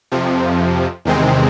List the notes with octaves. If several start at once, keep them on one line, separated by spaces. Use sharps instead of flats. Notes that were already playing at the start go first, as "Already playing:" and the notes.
F2 C3 F3
E2 C3 D#3 G#3 C4